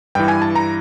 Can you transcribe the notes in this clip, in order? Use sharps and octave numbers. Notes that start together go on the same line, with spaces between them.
G2 E3 G5
G#5
A5
A#5